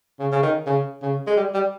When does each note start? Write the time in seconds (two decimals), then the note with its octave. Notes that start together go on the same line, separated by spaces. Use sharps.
0.20 C#3
0.32 C#3
0.43 D#3
0.67 C#3
1.02 C#3
1.27 G#3
1.37 G3
1.54 G3